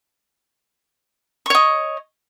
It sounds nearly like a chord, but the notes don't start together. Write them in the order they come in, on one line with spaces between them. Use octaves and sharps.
C#6 C#5 D#5